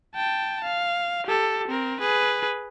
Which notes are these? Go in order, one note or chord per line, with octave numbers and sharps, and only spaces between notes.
G5 A5
F5
G4 A4
C4 A#4
G#4 B4